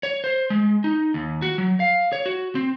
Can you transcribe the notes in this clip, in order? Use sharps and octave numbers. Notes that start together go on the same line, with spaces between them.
C#5
C5
G#3
D#4
D#2
F#4
F#3
F5
C#5
F#4
C4